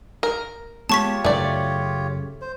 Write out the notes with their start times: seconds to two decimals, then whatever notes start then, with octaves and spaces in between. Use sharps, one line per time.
0.23 A#4
0.89 G#3 B3 F4 G4 C#5 A5 C#6 B6
1.25 F#2 C#3 A3 D5
2.41 C5